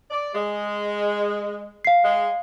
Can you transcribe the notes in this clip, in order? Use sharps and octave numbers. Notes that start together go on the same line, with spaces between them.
D5
G#3
F5 C7
G#3